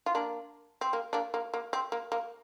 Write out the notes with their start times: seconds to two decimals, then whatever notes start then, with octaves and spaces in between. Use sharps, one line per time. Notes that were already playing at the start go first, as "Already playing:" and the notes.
0.06 F4
0.15 A#3 D4
0.81 C4
0.93 A#3
1.13 A#3 D4
1.34 A#3
1.54 A#3
1.73 C4
1.92 A#3
2.12 A#3